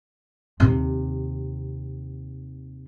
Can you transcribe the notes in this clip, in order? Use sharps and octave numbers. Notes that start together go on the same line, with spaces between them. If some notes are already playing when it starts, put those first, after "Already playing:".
D#2 C3